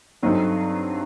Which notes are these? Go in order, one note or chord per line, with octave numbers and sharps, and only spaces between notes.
G2 F#3 C4 D#4 A4